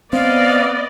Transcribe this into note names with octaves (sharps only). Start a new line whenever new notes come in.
B3 C4 D5 D#5 F5